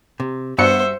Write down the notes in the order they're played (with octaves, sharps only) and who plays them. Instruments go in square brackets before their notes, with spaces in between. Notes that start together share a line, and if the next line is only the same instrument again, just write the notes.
[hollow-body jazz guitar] C3
[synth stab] G2 F#4 C#7 [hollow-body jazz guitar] B3 [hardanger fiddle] C5 [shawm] E5